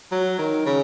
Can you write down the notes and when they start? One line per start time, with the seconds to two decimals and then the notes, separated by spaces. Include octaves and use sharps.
0.11 F#3
0.39 D#3
0.66 C#3